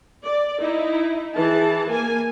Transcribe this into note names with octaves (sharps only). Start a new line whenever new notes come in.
D5
D#4 E4
E3 G#4 A5
A#3 G#5